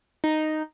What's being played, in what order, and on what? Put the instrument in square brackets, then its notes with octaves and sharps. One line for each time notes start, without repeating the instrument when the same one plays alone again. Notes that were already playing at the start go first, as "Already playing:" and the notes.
[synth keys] D#4